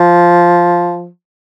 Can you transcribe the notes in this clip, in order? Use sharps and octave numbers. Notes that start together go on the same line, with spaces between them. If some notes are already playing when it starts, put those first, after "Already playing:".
Already playing: F3